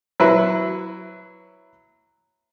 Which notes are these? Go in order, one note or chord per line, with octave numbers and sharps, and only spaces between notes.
F#3 E4 B4